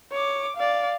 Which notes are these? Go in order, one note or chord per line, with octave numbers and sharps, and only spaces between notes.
C#5 D6
D5 F5